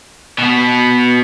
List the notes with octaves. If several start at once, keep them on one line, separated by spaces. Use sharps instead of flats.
B2 B3